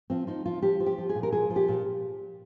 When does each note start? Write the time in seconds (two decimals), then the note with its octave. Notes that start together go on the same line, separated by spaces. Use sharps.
0.10 F3 C4
0.27 F3 D#4
0.46 F3 F4
0.62 F3 G4
0.80 F3
0.86 G4
0.98 F3
1.09 G#4
1.15 A#2
1.23 A#4
1.32 F3 G#4
1.50 F3
1.56 G4
1.68 A#2